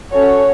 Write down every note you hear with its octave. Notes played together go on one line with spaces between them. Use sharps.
C#4 F#4 A4 C#5